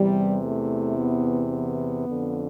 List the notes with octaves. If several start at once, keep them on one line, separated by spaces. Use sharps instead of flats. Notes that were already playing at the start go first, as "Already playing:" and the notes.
Already playing: E2 C3 E3 G3
A3
B3
B3
F2 D3